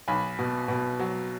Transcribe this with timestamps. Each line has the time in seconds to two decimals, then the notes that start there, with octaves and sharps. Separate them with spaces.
0.08 B1 G#5 B5
0.39 B2
0.68 B2
0.99 F#3